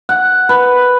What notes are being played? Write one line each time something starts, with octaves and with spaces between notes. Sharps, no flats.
F#5
B4